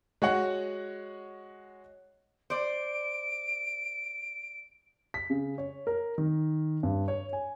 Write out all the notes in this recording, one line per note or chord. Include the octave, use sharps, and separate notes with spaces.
G#3 F#4 C#5 D#5 F#5
C5 D5 D7
B6
C#3
C#5
A#4
D#3
G2
C#5
G#5